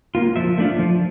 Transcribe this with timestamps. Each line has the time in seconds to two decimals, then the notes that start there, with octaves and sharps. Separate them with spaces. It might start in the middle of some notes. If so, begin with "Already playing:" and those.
0.15 A#3 F4
0.36 F3 E5
0.58 A3 D4 F4
0.79 F3